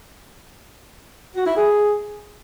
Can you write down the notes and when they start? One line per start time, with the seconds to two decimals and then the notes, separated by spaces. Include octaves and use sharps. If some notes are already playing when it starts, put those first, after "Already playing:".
1.36 F#4
1.46 E4
1.57 G#4